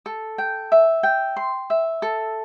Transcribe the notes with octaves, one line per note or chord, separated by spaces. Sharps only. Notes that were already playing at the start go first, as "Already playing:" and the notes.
A4
G5
E5
G5
C6
E5
A4